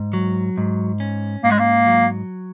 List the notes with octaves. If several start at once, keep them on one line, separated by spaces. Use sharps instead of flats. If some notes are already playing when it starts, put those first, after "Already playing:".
Already playing: G#2
F#3
G#2
C#4
G#2 A#3
G#3
A#3
F#3